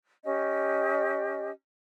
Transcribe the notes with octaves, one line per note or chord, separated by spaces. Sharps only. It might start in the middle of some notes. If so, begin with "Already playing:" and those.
C#4 G4 D#5